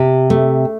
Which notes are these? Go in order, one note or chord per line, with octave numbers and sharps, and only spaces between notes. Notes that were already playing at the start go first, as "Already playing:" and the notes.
Already playing: C3
A3